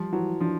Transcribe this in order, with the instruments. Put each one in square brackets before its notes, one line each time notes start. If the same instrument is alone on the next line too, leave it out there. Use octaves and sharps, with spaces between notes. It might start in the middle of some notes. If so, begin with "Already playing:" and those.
Already playing: [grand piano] F3 [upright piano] G3
[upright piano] E3 [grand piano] F#3
[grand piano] F3 [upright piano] D4